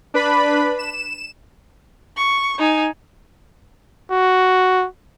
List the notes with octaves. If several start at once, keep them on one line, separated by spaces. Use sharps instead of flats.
D4 B4 B5
E7
C#6
D#4 G#5
F#4